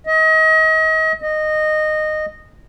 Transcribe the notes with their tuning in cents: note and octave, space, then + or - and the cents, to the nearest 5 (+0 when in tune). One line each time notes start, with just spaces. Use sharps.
D#5 +35
D#5 -15